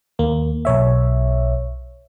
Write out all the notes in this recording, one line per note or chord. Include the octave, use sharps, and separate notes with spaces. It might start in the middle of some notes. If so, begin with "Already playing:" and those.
D#2 A#3
B1 C#5 E5